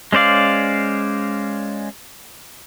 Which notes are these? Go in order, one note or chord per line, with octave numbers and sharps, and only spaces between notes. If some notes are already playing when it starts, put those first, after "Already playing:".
G#3 C#4 C5 D5 F5